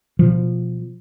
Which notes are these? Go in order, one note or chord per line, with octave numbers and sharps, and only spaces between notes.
B2 F3